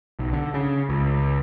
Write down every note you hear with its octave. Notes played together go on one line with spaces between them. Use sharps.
B1
D3
C#3
C#2